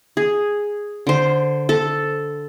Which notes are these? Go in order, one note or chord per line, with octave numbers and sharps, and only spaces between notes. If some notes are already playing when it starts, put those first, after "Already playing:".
G#4
D3 C5
A4